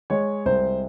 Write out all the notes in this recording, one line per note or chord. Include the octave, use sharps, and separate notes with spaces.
G#3 C#5
C2 C5